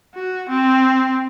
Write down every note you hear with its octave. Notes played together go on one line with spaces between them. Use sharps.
F#4
C4